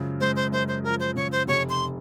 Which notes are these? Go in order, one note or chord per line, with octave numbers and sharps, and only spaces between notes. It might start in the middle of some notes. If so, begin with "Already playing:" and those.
Already playing: F#2 C#3 F3 G#3
G#3 C5
C5
F#2 C5
C5
F3 A#4
C5
C#3 C#5
C5
F1 C#5
C6